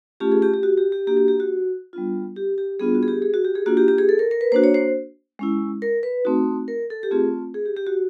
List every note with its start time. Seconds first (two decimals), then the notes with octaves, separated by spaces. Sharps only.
0.20 A3 C#4 F4 G4
0.32 G#4
0.42 G4
0.54 G4
0.63 F#4
0.78 G4
0.92 G4
1.07 A#3 D4 F#4 G4
1.17 G4
1.28 G4
1.40 F#4
1.93 G3 B3 D4 F4
2.36 G4
2.58 G4
2.80 G3 B3 D4 F4 G#4
2.95 F#4
3.03 G#4
3.08 G4
3.22 G#4
3.34 F#4
3.44 G4
3.55 G#4
3.66 A#3 D4 F4 F#4
3.77 G4
3.88 G4
3.98 G#4
4.09 A4
4.19 A#4
4.31 A#4
4.41 B4
4.52 A#3 D4 F#4 C5
4.64 C#5
4.74 C5
5.39 G#3 C#4 E4
5.82 A#4
6.03 B4
6.25 A3 C4 D#4 F#4
6.68 A#4
6.90 A4
7.03 G4
7.11 A3 C4 F4 G#4
7.54 G#4
7.66 G4
7.77 G4
7.87 F#4